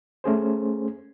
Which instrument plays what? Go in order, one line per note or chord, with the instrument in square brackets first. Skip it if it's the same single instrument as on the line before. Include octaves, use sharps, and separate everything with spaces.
[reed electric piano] A3 C#4 G#4 C5